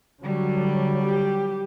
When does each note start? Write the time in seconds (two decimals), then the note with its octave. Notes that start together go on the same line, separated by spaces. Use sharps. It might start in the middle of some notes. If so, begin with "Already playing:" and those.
0.23 D3 F#3 G3
1.03 G4